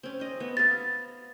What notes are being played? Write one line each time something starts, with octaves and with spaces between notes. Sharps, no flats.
C4 C#4
C5 D#5
B3
E5 F5 A6